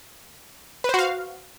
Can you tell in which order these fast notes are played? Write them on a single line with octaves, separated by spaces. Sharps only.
B4 C5 F#4 F5